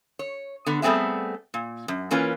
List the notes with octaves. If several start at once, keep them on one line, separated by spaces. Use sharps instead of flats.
C#5
D3 B3
G3 A3 B3 C4 G#4 E5
A#2
F#2
E3 A#3 C#4 F4 B4